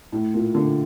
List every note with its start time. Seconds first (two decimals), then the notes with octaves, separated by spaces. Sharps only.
0.12 A2
0.34 A#2
0.54 A#2 D3